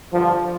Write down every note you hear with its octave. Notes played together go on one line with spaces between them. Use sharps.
G2 D3 F3